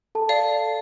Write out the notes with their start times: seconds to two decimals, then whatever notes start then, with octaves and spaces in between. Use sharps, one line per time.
0.15 A4 A5
0.29 D5 F5